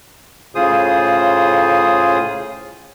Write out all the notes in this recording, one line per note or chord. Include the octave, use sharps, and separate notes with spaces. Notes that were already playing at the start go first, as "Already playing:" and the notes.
A2 C#3 F4 G#4 C5 D#6